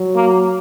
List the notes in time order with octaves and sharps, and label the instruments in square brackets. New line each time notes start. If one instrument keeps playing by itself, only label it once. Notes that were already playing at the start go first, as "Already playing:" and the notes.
Already playing: [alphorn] F#3
[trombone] A#3